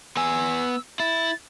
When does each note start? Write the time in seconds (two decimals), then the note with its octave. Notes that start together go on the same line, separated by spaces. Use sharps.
0.17 B3 G#5 E6
1.00 E4 A6